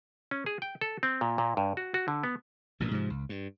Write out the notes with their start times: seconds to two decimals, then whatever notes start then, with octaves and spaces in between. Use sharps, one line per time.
0.31 C#4
0.46 G#4
0.62 G5
0.81 A4
1.03 C4
1.21 A#2
1.38 A#2
1.57 G2
1.77 F#4
1.94 F#4
2.08 D3
2.24 B3
2.80 A1 G2 A#2
2.91 G#2 C3 F3
3.10 C#2
3.29 G2